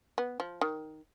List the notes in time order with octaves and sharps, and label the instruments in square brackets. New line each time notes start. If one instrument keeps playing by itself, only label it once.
[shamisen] B3
F3
D#3